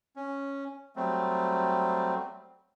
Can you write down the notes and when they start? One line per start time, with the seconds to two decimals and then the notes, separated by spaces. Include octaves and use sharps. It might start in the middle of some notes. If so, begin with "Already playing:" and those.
0.16 C#4
0.96 F#3 G3 A3 C4